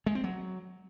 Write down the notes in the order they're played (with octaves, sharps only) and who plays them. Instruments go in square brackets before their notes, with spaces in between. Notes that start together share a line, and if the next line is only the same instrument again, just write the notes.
[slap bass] G#3
C4
F#3